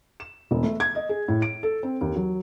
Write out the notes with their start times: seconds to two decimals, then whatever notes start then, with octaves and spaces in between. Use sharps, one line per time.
0.20 E7
0.51 E1
0.63 A3
0.80 G#6
0.95 D#5
1.09 G#4
1.28 A2
1.42 D7
1.63 A4
1.83 C4
2.01 D#2
2.16 F#3